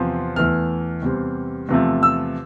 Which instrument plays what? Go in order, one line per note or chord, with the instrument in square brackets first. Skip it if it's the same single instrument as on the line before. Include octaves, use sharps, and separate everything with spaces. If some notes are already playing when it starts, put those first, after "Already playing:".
Already playing: [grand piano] E2 C3 F3 C4
E2 E3 A3 F6
E2 C3 G3 C4
E2 C3 F3 A3
E6